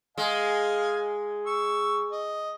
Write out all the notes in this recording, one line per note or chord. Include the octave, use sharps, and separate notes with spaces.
G#3 D#5 F5 G#5
C#6 E6
D#5